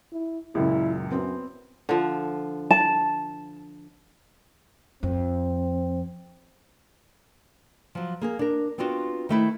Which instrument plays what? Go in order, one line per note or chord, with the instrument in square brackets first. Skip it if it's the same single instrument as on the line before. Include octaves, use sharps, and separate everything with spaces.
[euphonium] E4
[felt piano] C#2 F#2 A#2 [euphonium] E4
[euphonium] F#2 [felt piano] B3 C4
[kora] D3 F3
[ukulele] A5
[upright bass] F2 [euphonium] C4
[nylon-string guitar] F3 F#3
A#3 G#4 A#4
D4 A#4
B3 C4 D4 F4 F#4
D#3 A3 E4 C5